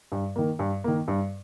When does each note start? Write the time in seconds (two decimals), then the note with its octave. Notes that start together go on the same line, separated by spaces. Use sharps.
0.12 G2
0.36 D#3 A#3
0.59 G2
0.84 D#3 A#3
1.08 G2